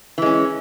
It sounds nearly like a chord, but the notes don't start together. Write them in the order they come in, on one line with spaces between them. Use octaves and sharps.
E3 G#3 C#4